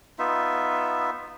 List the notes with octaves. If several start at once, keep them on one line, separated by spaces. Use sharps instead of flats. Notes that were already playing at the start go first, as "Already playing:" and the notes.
B3 D#4 F4 E5